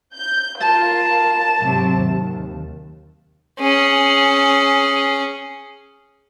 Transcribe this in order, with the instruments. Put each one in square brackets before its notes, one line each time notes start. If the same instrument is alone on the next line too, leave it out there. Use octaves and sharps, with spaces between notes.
[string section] G6
[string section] F4 A#4 [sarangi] A5
[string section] G#2 C3 F#3
D#2
[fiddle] C#4 G#4